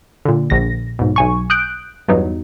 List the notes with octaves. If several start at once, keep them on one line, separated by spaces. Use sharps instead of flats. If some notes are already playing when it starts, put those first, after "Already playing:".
A#2 D3
A#1 A#6
B1 G#2
B1 G#5 C#6
D#6 F#6 G6 D7
E2 G2 F#3 B3 D#4